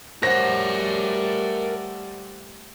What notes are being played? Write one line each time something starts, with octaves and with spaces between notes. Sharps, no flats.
G3 A3 A#4 C5 C#5 F#5 A#6